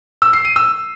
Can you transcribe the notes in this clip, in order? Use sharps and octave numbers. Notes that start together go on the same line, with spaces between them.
E6
C7
D#7
E6